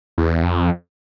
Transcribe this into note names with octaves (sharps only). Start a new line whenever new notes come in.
E2
F2